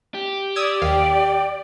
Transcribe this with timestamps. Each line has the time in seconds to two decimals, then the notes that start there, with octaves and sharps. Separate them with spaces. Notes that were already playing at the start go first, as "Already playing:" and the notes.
0.14 G4
0.56 D5 D#6 E6 G#6
0.82 D#2 F5 G5